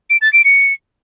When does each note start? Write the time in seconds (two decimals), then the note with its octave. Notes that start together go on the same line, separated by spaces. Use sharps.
0.10 D7
0.21 A6
0.33 D7
0.45 C#7